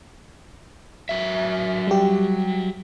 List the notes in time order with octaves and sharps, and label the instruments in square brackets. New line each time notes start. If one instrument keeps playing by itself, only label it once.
[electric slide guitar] F#3 E5
[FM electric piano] G3 G4